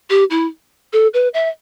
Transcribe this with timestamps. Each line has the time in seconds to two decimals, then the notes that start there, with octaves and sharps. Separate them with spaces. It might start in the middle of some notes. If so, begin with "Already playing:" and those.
0.10 G4
0.30 E4
0.93 A4
1.14 B4
1.34 E5